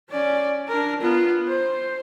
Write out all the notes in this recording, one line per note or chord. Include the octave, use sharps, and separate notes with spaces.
C#4 D5
D4 A#4
B3 F4
C5